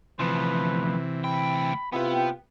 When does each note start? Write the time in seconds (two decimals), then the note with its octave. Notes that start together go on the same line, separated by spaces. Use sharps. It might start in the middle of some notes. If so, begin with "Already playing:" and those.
0.20 D2 C3 E3 F3 B4
1.24 D2 G5 B5
1.93 C3 B3 E4 F4 B4 G5